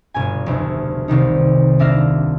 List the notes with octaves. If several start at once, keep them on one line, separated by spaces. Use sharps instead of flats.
G1 B2 G#5
F1 D2
C2 C3 D#3 D#4
D#1 D4 E5 F5 A#6